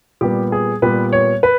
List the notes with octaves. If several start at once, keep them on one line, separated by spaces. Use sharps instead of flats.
A#2 G3 B3 G4
G#4
A#2 G3 B3 B4
C#5
B4